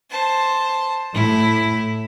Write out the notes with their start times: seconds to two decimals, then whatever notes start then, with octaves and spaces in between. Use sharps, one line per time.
0.10 C5 A5
1.14 A2 E4